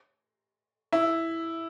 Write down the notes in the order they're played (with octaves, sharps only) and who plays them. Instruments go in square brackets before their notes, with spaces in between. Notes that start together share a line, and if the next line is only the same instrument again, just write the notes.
[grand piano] E4